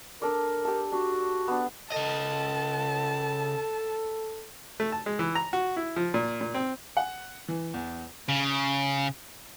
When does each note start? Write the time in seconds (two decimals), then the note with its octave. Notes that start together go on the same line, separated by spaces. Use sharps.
0.22 D4 A4 A#4 D5
0.65 G4 A4
0.92 D4 F#4
1.48 B3 D4
1.92 C#3 A4 D#5 A5
4.80 A3
4.92 A5
5.06 G#3
5.19 E3
5.35 A#5
5.53 F#4
5.77 E4
5.96 F3
6.14 A#2
6.41 A#2
6.54 C4
6.97 F#5
7.48 E3
7.74 E2
8.28 C#3